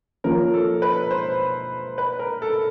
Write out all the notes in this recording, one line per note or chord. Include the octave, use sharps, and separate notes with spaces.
F3 A#3 C#4 F4 A#4
A4
B4
C5
B4
A#4
A4